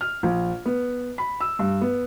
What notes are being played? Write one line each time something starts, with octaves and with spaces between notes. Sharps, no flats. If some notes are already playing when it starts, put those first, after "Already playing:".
F6
A#1
B3
B5
E6
G2
B3